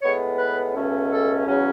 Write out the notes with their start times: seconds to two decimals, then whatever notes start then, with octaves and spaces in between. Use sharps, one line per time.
0.03 A2 G#3 B3 C#5
0.38 B4
0.74 C#2 B2 A3 C#4
1.10 A4
1.45 E2 C#3 F#3 C#4